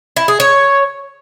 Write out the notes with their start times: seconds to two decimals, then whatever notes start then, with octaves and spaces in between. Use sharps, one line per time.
0.17 E4
0.28 G#4
0.40 C#5